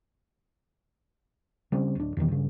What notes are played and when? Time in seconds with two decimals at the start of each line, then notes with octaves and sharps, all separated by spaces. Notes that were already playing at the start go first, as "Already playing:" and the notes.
1.72 C#3 G3 C4
1.95 D1 D4
2.17 E2 B2 D#3 G3
2.28 G2 C#3